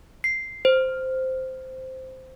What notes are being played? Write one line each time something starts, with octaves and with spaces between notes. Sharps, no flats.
C7
C5